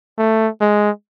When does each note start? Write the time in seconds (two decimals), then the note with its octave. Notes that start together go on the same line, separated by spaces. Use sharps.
0.18 A3
0.61 G#3